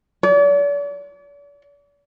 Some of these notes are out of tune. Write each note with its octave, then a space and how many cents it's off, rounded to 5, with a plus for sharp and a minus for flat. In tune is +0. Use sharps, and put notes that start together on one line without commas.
D5 -45